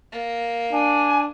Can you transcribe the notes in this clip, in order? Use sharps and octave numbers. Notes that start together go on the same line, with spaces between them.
A#3
D4 G#5